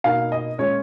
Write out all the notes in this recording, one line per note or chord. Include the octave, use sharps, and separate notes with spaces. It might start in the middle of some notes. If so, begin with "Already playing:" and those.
B2 A#3 D#4 F5
D#5
A#2 G#3 C#4 C#5